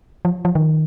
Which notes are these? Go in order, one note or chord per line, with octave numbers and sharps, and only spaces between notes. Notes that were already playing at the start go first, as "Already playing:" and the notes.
F3
F3
D#3